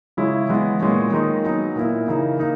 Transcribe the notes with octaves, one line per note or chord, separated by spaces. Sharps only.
C#3 G#3 C#4 E4
E3 G#3 B3
A#2 G#3 C#4
D#3 G#3 D#4
F#3 B3 D#4
A#2 A#3 E4
C#3 E3 A#3 D#4
A#3 D#4